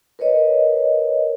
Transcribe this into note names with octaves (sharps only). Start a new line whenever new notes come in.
A#4 B4 C#5 D#5